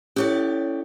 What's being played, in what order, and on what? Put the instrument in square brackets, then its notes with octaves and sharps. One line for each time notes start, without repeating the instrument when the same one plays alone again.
[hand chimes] C#4 E4 A4 [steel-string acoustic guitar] G4 C#5 D5